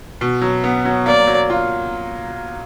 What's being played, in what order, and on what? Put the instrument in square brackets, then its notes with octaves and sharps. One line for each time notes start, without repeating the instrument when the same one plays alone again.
[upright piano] B2
F#3
B3
F#3
[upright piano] A#3 [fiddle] D5
[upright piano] F#3
F4